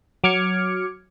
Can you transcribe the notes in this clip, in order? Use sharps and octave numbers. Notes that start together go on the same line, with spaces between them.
F#3 D6 F6 G#6 C#7